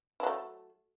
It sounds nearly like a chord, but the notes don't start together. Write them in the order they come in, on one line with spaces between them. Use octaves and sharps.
E4 F#3 A3